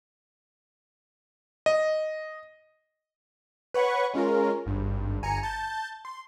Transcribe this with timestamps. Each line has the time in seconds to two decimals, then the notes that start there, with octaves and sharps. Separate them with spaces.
1.66 D#5
3.74 B4 C#5 F#5 B5 C#6
4.13 G#3 C#4 F4 A#4
4.66 G#1 G2
5.22 G1 G#5 A#5 C#7
5.43 A5 G6 A6
6.05 C6